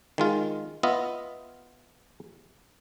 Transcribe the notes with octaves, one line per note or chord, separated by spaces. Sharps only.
D#3 G#3 F4
B3 F4 D#5 E5